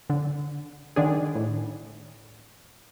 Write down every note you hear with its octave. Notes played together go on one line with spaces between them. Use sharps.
D3
D3 D#3 D4 G#4
A2